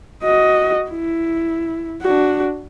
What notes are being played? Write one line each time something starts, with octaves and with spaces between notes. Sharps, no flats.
F#4 D#5
E4
D4 F#4